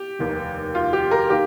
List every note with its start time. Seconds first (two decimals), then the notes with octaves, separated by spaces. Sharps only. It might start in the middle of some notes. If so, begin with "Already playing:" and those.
Already playing: G4
0.19 F1 D#2 D#3
0.75 F4
0.93 G4
1.11 A#4
1.30 D#3 A#3 G4